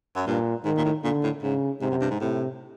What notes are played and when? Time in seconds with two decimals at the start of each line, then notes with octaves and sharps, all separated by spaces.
0.16 F#2
0.27 G2 A#2
0.65 G#2 D#3
0.78 A#2
0.85 A2
1.04 A#2 D3
1.24 A2
1.43 G#2 C#3
1.81 G#2 C3
1.91 F#2
2.01 G2
2.11 G#2
2.21 A2 C3